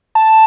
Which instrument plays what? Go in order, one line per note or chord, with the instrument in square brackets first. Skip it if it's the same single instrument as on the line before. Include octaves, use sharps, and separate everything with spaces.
[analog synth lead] A5